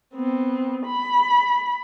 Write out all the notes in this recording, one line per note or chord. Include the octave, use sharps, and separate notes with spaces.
B3 C4
B5